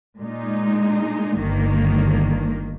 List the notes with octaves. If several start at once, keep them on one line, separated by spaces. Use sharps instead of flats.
A#2 G#3 D#4
G1 G2 D#3 A#3